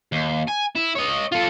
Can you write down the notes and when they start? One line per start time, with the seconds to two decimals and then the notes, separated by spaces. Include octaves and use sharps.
0.12 D#2
0.48 G#5
0.75 E4
0.95 C#5 D#5
1.32 F4 A4